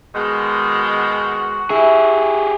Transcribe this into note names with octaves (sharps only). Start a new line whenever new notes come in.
B2 D#3 G#3 F#4
E4 G4 G#4